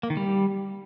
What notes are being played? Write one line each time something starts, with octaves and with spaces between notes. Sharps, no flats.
A#3
D#3
G3